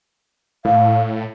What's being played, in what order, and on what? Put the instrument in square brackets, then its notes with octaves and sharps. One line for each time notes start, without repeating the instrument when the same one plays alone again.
[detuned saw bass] A2 [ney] F5